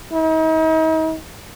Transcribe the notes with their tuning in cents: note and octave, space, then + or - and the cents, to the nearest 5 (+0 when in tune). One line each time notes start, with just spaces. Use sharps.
D#4 +40